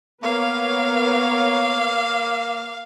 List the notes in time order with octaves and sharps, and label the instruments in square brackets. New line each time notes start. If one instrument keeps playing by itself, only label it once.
[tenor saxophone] A#3 [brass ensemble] B3 [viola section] A#4 B4 C#5 [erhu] F5